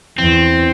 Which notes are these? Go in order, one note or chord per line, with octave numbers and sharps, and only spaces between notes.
E2 C4